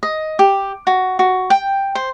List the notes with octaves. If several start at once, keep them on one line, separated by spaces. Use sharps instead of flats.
D#5
G4
F#4
F#4
G5
C5